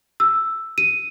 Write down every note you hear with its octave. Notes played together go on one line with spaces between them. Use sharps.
E6
D#7